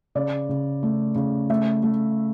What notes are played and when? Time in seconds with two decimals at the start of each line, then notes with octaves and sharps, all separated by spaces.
0.15 C#3 D5
0.49 C#3
0.83 A3
1.16 C#3
1.50 A3 E5
1.83 A3